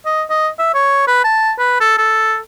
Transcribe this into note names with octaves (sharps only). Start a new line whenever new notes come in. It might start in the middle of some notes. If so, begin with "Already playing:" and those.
D#5
D#5
E5
C#5
B4
A5
B4
A4
A4